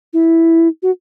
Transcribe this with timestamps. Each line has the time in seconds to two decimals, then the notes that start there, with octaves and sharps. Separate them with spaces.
0.13 E4
0.82 F#4